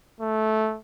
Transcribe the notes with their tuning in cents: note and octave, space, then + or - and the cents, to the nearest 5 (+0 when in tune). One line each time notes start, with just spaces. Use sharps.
A3 -15